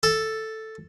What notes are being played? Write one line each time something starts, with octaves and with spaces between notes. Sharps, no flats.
A4